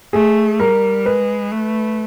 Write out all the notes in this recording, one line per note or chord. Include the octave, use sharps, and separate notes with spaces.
A3 G#4
G3 A#4
G#3 B4
A3